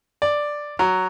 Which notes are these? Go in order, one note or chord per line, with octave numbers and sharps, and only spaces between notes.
D5
F#3